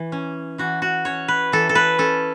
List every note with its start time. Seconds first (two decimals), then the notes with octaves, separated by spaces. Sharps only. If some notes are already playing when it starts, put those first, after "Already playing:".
Already playing: E3
0.12 C#4
0.58 E3 F#4
0.82 F#4
1.05 C#4 C#5
1.28 B4
1.52 E3 A4
1.69 A4
1.75 B4
1.98 C#4 A4